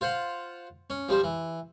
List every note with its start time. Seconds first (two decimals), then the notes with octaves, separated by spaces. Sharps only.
0.01 F4 C5 F5 F#5
0.90 C#4
1.09 F3 G3 C5
1.24 E3